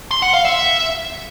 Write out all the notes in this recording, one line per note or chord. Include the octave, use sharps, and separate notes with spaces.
C6
F#5
F5
E5